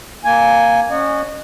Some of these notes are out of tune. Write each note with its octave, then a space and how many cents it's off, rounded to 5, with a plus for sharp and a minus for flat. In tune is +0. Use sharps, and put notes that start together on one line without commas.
A#3 +0 G#5 +0
C#4 +0 D#5 -35 F#5 +0